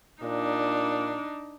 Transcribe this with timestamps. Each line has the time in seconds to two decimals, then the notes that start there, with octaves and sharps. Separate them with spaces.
0.23 A#2 D4 D#4